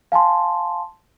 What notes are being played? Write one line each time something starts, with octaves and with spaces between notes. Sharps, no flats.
F5 G#5 A5 C6